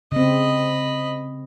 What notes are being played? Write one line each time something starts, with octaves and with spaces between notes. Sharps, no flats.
C#3 C4 D#5 B5